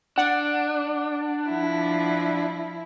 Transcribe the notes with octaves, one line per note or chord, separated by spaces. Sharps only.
D4 F#5
F3 E4